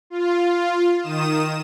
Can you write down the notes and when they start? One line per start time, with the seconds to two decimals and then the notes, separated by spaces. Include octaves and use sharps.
0.10 F4
1.01 D#3 D#6 E7